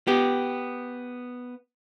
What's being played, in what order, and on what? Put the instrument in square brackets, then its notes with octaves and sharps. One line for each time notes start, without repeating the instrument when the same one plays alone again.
[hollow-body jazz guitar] B3 G4